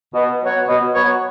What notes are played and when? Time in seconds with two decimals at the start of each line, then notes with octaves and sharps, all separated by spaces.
0.14 B2
0.41 F#3 B3 F#4 C#5
0.67 B2
0.94 F#3 B3 F#4 C#5